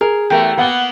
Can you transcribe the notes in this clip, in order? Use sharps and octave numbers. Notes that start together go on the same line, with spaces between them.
G#4 A#4
E2 A3 G4 A#4
A#3 B3 F#5 G7